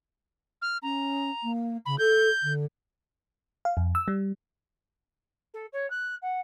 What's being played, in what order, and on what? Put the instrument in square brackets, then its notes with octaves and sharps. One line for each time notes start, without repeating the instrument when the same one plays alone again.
[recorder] F6
[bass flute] C#4 [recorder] A#5
[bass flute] A#3
[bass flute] C#3 [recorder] B5
[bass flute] A4 [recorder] G6
[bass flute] D3
[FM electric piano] F5
F2
E6
G3
[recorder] A4
C#5
F#6
F#5